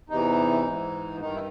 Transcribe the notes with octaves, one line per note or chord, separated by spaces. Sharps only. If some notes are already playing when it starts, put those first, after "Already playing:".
E2 C3 E3 D#4
G#2 E3
G2 D#3 D#4
E4